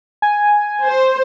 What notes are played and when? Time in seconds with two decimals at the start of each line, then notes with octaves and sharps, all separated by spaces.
0.22 G#5
0.85 C5